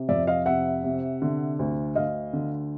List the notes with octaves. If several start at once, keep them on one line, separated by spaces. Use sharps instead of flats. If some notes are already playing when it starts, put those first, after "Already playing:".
Already playing: C3
F2 D5 E5
D#5 F5
C3 E5 F#5
C3
D3
D2
D2 D#5 F5
D3